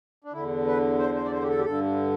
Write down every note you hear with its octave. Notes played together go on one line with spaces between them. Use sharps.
D4
E2 D3 E4
B4
C5
C5
D5
C5
G4
A4
G4
G2 D3 A4